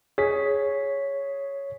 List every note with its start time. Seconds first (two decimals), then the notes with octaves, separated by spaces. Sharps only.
0.18 G#4 C#5 B6